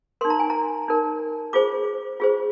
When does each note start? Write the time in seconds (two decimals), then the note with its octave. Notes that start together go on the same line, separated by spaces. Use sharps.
0.21 D#4 A#4 C6
0.30 A#5
0.39 G#5
0.50 A#5
0.88 D#4 A#4
1.53 F4 G#4 C5 D6
2.20 F4 G#4 C5